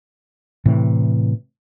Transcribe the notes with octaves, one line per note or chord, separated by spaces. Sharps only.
A2 C3 E3